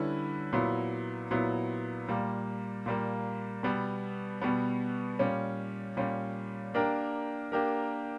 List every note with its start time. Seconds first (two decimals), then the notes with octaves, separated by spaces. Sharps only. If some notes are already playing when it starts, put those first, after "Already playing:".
Already playing: D3 G3 C#4 E4 B4
0.53 A#2 F#3 B3 E4
1.31 A#2 F#3 B3 E4
2.08 A#2 G3 A#3
2.86 A#2 G3 A#3
3.63 B2 G3 B3
4.41 B2 G3 B3
5.19 A#2 G3 C#4
5.97 A#2 G3 C#4
6.74 A#3 D4 G4 A#4
7.52 A#3 D4 G4 A#4